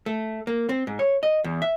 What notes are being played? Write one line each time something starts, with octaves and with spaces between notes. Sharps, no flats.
A3
A#3
C4
G#2
C#5
D#5
E2
E5